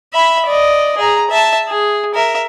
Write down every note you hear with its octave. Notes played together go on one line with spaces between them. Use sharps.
E5 B5
D5 D#5
G#4 A#5
E5 A5
G#4
A#4 E5